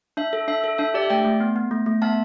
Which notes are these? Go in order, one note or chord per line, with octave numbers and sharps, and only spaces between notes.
D4 E5
A4
D4 E5
A4
D4 E5
G4 D5
E5
A3 D5 G5
A3
B3
B3
A3
A3
B3 E5 A5